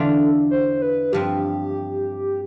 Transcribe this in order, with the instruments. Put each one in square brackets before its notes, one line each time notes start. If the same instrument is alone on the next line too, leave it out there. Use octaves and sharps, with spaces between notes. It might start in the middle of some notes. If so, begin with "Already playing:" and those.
Already playing: [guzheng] E2 D3 A3 D4 F4
[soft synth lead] A4
C5
B4
[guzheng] G2 F3 C4 [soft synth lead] G4